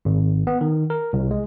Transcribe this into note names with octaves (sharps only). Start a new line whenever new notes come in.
G#1
B3
D#3
A#4
C2
G#3